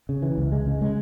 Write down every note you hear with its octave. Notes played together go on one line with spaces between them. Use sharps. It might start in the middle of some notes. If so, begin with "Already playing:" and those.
C#3
E3
C#2
G#3
C#3
G#3